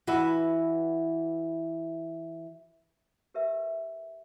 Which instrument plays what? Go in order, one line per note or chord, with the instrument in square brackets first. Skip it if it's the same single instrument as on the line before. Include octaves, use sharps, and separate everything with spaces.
[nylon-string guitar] E3 F#4 B4 E5
[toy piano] G4 A#4 B4 E5